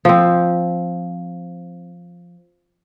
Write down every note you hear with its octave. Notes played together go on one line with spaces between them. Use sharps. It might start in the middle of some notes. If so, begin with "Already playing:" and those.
F3 C4